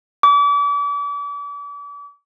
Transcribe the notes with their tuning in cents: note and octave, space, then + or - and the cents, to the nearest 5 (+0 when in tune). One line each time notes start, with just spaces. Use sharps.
D6 -40